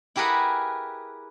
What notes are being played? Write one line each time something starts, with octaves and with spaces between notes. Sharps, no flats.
E4 G4 G#4 A#4 B4 F#5